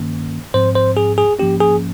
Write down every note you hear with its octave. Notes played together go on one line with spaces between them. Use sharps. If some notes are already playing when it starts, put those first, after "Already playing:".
Already playing: G2 D#3 A#3 C#4
G#2 F3 C4 C5
C5
G#4
G#4
G#2 F3 A#3 C#4 G4
G#4